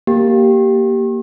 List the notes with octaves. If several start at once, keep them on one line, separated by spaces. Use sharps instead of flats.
A#3 G4